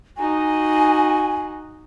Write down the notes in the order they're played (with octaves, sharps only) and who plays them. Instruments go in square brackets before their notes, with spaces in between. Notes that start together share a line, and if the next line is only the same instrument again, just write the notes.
[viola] D#4 F#4 [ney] G#5